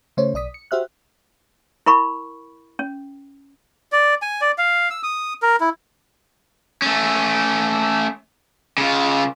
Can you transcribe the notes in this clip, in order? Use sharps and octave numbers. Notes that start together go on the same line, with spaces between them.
C#3 A3 C5 C#5
B1 D5 D#6 B6
C#7
F#4 G4 C5 E5 F6 F#6
E4 A#4 B5 C#6
C#4
D5
G#5
D5
F5
E6
D#6
A#4
E4
A3 C#4
C#3 F4